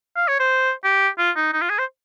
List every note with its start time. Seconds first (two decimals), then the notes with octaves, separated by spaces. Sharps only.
0.16 F5
0.28 C#5
0.39 C5
0.84 G4
1.18 F4
1.36 D#4
1.53 D#4
1.61 F4
1.70 G#4
1.78 C5